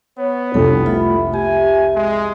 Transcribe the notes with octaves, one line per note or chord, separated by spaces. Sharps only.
B3 C#5
C2 F2 D4 A4
A3 F4 E5 B5
G4 E5 G#5
G#3